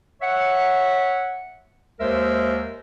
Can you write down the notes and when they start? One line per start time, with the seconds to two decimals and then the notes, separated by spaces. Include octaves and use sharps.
0.22 C#5 E5 F#5
2.00 D#2 G#3 A#4 C5 E5